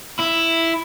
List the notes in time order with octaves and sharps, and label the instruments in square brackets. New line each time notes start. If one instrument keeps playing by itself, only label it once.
[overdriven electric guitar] E4